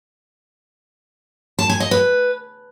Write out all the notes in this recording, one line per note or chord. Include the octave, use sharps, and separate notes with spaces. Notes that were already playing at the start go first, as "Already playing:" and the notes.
A5
G#5
D#5
B4